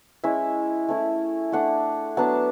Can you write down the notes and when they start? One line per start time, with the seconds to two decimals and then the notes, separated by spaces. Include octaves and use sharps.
0.24 G#3 C#4 E4 E5
0.88 A3 C#4 E4
1.52 A3 D4 F#5
2.17 F#3 B3 D4 A5